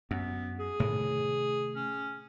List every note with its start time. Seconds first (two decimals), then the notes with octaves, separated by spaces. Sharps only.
0.11 F#2 B3
0.60 G#4
0.80 A2 C3 D#3
1.76 C#4